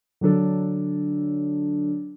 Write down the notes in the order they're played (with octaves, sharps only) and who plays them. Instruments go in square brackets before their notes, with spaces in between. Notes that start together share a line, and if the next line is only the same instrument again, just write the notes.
[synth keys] D3 F#3 D4 A4